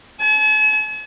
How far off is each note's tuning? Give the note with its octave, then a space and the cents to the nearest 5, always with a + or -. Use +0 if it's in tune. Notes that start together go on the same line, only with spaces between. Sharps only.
A5 -45